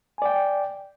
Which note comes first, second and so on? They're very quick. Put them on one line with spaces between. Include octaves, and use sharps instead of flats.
G#5 D5 G5